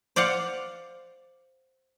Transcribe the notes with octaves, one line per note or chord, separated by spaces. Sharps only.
C5 D5 F5 F#5